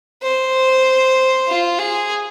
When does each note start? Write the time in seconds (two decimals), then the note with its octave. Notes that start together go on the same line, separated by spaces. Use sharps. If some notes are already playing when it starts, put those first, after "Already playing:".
0.23 C5
1.48 F4
1.79 G#4